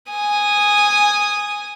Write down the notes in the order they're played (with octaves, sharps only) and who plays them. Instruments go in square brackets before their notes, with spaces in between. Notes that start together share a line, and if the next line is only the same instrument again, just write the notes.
[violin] G#5 D#6